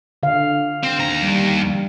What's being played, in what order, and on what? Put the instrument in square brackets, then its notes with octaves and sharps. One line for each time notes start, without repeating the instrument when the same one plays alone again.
[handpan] D3 F5
[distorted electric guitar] C4
D#2 A#5
[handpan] G3